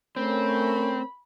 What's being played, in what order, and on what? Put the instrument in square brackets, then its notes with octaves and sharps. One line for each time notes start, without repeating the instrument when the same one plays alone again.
[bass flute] A3 [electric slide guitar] C4 [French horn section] C#4 A#4 [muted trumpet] B5